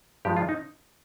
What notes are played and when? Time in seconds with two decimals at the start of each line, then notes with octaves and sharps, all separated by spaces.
0.25 G2 F3 G#3 G4
0.37 F4
0.49 D#4